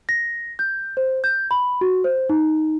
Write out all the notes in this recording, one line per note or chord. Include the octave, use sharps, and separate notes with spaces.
A#6
G6
C5
G6
B5
F#4
C5
D#4